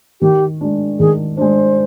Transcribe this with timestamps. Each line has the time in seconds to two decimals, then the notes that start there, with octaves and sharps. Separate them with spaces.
0.21 D#3 G4
0.61 G#3 D4
1.00 D#3 G#4
1.37 G#3 D4 C5